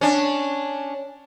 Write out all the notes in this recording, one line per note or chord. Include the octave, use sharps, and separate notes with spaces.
C#4 D4